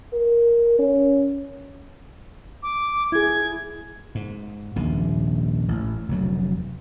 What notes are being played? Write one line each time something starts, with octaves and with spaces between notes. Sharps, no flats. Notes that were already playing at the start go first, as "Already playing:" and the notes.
A#4
C#4
D6
E4 G#4 G#6
G#2
D#1 A#1 C3
A1
F1 D2 F#3